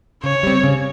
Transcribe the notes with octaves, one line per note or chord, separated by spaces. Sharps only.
C#3 C#5
G3 C4
C#3